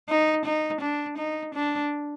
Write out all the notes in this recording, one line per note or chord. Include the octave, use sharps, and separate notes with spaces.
D#4
D#4
D4
D#4
D4